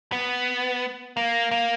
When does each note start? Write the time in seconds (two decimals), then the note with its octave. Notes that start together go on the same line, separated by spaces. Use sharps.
0.12 B3
1.17 A#3
1.51 A#3